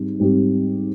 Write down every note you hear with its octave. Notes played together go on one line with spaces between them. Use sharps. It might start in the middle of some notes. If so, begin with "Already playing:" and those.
Already playing: G#2 G3 C4
G#2 G3 C4 G4